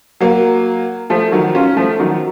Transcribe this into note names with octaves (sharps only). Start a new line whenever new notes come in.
F#3 A#3
F3 A3
D#3 F#3
C#4 F4
F3 A3
D#3 F#3